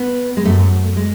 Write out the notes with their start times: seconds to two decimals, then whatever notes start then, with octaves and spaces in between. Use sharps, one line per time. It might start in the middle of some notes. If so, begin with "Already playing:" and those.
Already playing: B3
0.37 G#3
0.45 F#2 A3
0.97 G#3